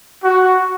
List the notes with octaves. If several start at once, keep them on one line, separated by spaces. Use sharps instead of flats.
F#4